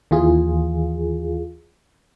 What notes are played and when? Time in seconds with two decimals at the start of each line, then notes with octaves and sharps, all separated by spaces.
0.11 D#2 E3 F4 G#4